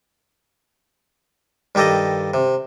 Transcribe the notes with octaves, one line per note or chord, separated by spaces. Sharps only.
G2 D#3 G4 A4 D#5
C3